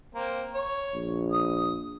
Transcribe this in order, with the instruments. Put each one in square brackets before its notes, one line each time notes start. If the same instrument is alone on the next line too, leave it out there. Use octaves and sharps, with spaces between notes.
[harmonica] A#3 C4
C#5
[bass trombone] A#1
[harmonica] D#6